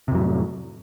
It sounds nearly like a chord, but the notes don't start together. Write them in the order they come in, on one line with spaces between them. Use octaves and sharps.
C3 F2 F#3 A2